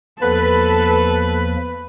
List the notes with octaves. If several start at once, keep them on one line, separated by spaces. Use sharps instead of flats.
E2 F3 A#3 A4 B4